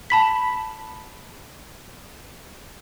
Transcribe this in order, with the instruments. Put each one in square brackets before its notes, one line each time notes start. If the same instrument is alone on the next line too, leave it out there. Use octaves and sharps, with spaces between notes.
[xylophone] A5 B5 B6